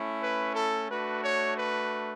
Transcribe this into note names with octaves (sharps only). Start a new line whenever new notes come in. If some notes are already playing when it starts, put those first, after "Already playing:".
Already playing: A3 C#4 E4
B4
A4
A3 D4 F#4 B4
C#5
B4